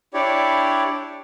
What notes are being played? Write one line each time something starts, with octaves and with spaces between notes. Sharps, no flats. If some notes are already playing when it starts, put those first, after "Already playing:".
D4 E4 G4 C#5 D5